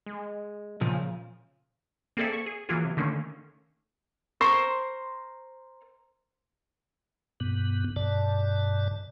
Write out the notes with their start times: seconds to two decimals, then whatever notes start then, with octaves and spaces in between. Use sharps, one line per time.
0.06 G#3
0.81 A#2 C#3 F3
2.17 A#3 C4 G#4 A4 D5 E5
2.32 C#6
2.46 G#4
2.69 E3 F#3 A#3 F4 G#4
2.85 C3
2.97 D3 D#3 A3 A#3 C#4
4.41 A#4 C5 C6 C#6
7.40 G2 B2 B3
7.96 G2 B2 D5 A5